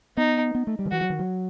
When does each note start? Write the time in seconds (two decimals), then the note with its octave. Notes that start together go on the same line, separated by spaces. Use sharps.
0.17 B3 D#4
0.55 B3
0.67 A3
0.79 G3
0.86 D#3
0.91 E3 F#4
1.01 F#3
1.10 D#3
1.19 F#3